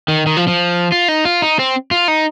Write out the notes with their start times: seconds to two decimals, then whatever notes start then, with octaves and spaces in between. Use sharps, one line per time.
0.08 D#3
0.26 D#3
0.37 F3
0.48 F3
0.92 F4
1.08 D#4
1.25 F4
1.42 D#4
1.59 C4
1.91 F4
2.08 D#4